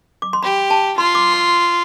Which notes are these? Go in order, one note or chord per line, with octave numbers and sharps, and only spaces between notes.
D6
C6
G4 B5
A5
F4 C6
D6
C6